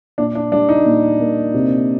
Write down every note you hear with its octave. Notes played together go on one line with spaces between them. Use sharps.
A#2 D4
D4
G3 D4
D#4
A#2
A#3
C3